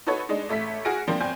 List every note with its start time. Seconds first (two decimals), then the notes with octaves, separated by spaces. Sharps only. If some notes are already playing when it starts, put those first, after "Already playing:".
0.07 D#4 F#4 A4 B4 C#5
0.29 G#3 D4 D#4
0.49 A1 A3 E5 B6
0.85 F#4 G#4 F6 A#6 D7
1.07 D3 F3 G3 A#3 C4
1.20 G1 C4 D5 G#5 G6